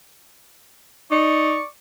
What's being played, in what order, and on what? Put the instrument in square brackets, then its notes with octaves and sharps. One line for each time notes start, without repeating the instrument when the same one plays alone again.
[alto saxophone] D#4 [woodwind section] D5 C#6